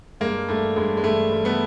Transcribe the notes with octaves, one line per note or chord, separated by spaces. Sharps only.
G2 G#3 A#3
G2 A3
G2 G#3
G#3
G2 A3
G3
A3 B3